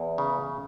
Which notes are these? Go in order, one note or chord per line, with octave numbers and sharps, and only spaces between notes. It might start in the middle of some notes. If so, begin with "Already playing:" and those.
Already playing: E2
C#3